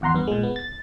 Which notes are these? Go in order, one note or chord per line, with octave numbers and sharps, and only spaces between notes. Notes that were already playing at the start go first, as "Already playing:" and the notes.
G#1 E2 F#5 A#5 C6
G2 B3
A#2 G#3
B3
A6